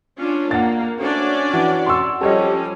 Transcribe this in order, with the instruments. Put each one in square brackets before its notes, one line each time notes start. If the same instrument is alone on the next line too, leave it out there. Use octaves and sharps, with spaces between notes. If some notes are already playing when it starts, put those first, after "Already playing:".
[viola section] C#4 D4 F4
[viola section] A#3 [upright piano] F#5 A6
[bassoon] D2 [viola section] C#4 D4 D5
[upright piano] E3 [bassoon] F#4
[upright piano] C6 C#6 E6
[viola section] F3 G3 C#4 [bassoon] G4 [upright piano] A4 C#5 D#5